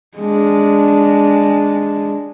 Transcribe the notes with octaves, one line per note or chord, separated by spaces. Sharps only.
G#3 D4